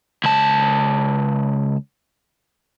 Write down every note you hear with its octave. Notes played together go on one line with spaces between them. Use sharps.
C#2 A5